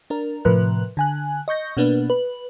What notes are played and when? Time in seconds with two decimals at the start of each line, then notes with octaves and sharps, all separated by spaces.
0.10 D4 A#4
0.45 A2 C3 F3 A#4 B4 F#6
0.97 D3 G#5 F#6
1.48 D#5 C#6 G6 A#6
1.77 B2 A#3 B3 D4 B4
2.10 B4